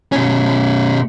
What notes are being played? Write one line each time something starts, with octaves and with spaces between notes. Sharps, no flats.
B2 C#4